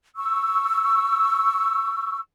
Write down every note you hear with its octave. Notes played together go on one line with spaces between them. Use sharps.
C#6 E6